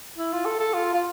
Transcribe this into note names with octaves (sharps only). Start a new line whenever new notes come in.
E4
F4
A4
A4
F4
F4